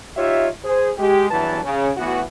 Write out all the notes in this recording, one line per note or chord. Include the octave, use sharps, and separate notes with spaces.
D#4 F4 G4 C#5 E5
G#4 C5
G#3 G4
E2 G2 E3 F#3 B4 A5
C#3
A2 E3 B3 E4 F#4